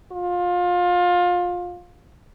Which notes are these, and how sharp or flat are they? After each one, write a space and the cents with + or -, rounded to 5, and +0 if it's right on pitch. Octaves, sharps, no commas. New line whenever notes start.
F4 +25